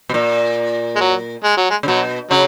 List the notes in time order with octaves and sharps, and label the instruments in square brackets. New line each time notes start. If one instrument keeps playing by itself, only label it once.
[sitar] B2
A#2
[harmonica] G#3
F#3
G#3
F#3
G#3
[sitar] C#3
[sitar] B2 [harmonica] F#3
[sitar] C#3 [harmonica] F#3